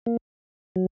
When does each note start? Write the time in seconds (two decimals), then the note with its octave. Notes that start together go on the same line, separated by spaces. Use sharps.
0.06 A#3
0.76 F#3